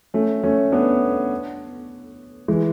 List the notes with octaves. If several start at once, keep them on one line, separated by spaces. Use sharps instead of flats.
A3 C#4
A3 C#4
B3 D4
E3 G#3